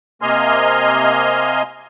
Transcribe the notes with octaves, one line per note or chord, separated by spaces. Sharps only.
C3 A#3 D#5 G#5 C6 F6